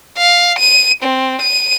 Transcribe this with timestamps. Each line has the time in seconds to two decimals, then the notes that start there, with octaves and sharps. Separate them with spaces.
0.18 F5
0.58 D#7
1.03 C4
1.41 D#7